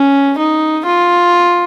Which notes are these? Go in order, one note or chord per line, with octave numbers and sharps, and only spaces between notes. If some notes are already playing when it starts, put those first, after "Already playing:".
Already playing: C#4
D#4
F4